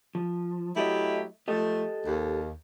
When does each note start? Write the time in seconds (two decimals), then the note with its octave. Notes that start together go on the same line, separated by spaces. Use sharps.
0.15 F3
0.76 F#3 A3 E4 G4 D#5
1.48 F3 A3 G4 A4 D#5
2.06 D#2